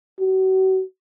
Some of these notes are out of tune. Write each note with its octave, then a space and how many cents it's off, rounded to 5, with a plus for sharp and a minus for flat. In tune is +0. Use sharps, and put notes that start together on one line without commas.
F#4 +40